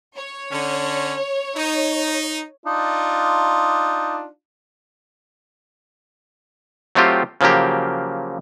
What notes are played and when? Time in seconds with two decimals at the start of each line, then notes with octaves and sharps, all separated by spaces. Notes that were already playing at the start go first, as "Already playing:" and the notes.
0.16 C#5
0.51 D3 C#4
1.56 D#4
2.66 D4 D#4 F4
6.95 F#3 A3 C4 F4 G4
7.41 C#3 F3 F#3 A#3 G4